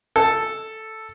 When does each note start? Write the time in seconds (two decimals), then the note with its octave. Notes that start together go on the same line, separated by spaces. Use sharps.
0.16 A4